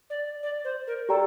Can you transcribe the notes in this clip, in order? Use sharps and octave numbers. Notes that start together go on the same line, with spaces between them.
D5
D5
C5
A#4
G4 A4 D5 G5 A#5